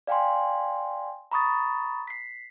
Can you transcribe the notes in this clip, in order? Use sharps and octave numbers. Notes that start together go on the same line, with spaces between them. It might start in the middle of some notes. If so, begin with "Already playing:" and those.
D5 F5 G5 G#5 C6
A#5 B5 C#6 D#6 A6
B6 C7